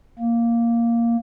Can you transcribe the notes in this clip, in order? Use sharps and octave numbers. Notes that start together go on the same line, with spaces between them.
A#3